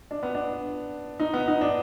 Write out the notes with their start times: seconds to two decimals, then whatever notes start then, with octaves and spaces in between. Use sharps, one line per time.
0.11 D4
0.23 B3
0.35 D4
1.20 D#4
1.34 B3
1.48 D#4
1.61 D4